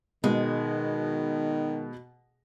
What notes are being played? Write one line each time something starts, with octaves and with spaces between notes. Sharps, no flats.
B2 D#3 G#3